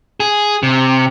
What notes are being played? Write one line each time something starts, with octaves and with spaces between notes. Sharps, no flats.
G#4
C3